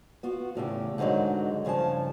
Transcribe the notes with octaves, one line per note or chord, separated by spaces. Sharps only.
B3 F4 F#4
E2 A2 C#3 G4
G#2 D3 D#3 F#3 G#3
G2 C#3 F3 G#5 A5